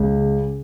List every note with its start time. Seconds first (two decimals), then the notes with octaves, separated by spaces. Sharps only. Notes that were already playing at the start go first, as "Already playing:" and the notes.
Already playing: C#2
0.18 C#3